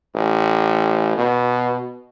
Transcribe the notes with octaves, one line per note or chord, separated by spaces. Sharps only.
A1
B2